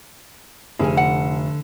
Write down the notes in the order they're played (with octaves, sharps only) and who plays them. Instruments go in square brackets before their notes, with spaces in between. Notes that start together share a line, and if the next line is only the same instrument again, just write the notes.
[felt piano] F1 [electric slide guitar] D3 [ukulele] G#4 A#4 G#5
[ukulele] F#5